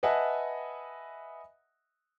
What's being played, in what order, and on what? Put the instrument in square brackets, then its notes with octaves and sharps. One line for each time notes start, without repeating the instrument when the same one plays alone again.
[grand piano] B4 D#5 E5 F#5 G#5 A5